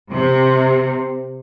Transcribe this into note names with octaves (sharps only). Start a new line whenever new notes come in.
C3